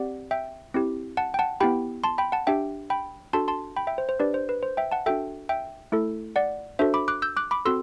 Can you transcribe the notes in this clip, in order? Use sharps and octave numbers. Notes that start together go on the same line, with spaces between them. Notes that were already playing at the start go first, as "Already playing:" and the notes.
Already playing: C4 G4 D5 F#5
E5 G5
C4 E4 G4
F#5 A5
G5
F#5 A5
B3 E4 G4 G5 B5
A5 C6
G5 B5
F#5 A5
D4 G4 E5 G5
G5 B5
D4 F#4 A4 A5 C6
A5 C6
G5 B5
E5 G5
C5
C5
D4 G4 B4 D5
C5
B4
C5
E5 G5
F#5 A5
D4 F#4 A4 E5 G5
E5 G5
A3 E4 A4
D5 F#5
D4 F#4 A4 C5 E5
B5 D6
D6 F#6
E6 G6
D6 F#6
B5 D6
C4 F#4 A4 C6 E6